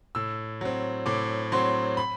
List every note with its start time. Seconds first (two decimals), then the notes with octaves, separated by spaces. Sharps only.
0.15 A2 E6
0.61 F#3 C4
1.06 A2 D6
1.52 F#3 C4 C6
1.97 B5